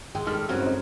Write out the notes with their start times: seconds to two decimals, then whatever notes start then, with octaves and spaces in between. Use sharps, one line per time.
0.15 G#1 G#3 G5 E6
0.27 D#3 G3 G#3 D4 A4 F6
0.49 G2 C#3 F#3 C4 C#4 F#4 A#4
0.62 D#4 C5